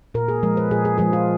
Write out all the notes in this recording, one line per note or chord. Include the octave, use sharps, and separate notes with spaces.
A#2 A#4
G#4
F3 G#3 A#4
B4
A#2 G#4
G#4
F3 G#3 G#4
F4